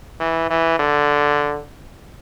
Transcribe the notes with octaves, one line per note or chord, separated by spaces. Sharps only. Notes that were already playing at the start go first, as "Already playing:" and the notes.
E3
E3
D3